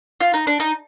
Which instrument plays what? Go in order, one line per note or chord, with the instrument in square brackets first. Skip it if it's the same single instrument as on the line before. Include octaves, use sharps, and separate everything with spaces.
[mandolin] F4
D#4
D4
D#4